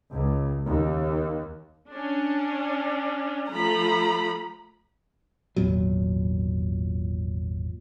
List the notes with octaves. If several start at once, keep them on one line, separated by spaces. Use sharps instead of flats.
C#2
D#2
C#4 D4
F3 A3 A#5 B5
G#1 E2 A#2 F#3